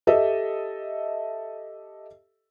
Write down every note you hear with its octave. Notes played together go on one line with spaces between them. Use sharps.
G4 A4 D#5 E5